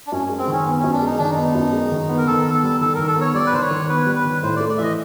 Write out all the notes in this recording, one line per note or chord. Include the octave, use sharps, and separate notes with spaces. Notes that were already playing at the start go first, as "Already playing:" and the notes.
D4
F#2 C#4
G#3
C4
D#3 C#4
B3
C#4
F#2
D4
G#3 D#4
D#3 D4
D#4
B3
F#2
G#3
D#3
B3
A#4
D#3 A4
B3
A4
G3
D#3 A4
D#3 A#4
A4
B3 C#5
G3 D5
B4
D#3 C5
C#5
D#3
B3 B4
G3
B4
D#3
A2 C5
D5
A3
D5
E3 D#5 E5